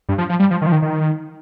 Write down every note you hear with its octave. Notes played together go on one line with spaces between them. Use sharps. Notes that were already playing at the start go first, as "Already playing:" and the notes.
G2
F3
F3
G3
F3
D#3
F3
D#3
D#3